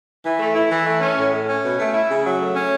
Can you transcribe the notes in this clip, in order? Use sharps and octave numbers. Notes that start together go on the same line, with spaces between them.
E3
A3
E4
E3
A3
C#4
A2
A3
C#4
B2
A3
E4
C#3
F#3
A3
C#4